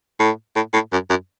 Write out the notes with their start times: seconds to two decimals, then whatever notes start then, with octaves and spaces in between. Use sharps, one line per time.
0.20 A2
0.56 A2
0.73 A2
0.92 F#2
1.10 F#2